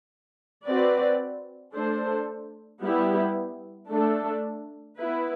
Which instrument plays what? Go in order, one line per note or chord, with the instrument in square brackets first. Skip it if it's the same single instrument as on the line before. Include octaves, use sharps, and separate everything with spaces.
[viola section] C4 F#4 B4 D5
A3 D4 A4 C5
G3 B3 E4 G4
A3 D4 A4
B3 E4 B4